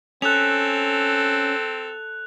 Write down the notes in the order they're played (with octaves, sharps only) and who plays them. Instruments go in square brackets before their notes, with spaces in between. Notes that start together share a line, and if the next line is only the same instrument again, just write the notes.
[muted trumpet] C4 [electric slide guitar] C#4 [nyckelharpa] A4 [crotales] F#6 F7